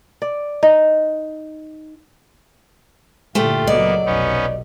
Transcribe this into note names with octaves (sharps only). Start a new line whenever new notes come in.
D5
D#4
G2 A#2 D3 A3 F4 G4
C#2 F#3 A#3 B3 D5 D#5
F1 B1 B3 C#4 D#4